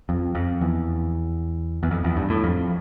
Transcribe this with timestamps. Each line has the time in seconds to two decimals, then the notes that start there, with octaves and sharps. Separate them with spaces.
0.09 F2
0.35 F2
0.61 E2
1.83 E2
1.91 F2
2.04 E2
2.17 G2
2.30 A2
2.44 F2